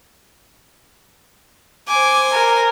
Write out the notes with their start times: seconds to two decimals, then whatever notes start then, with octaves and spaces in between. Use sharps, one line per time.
1.88 C5 G#5 D6
2.32 A#4